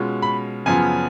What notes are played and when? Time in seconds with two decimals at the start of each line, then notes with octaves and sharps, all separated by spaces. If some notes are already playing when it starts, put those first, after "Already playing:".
Already playing: B2 G#3 C#4 F4
0.22 B5
0.66 F#2 C#3 F3 B3 F4 G#5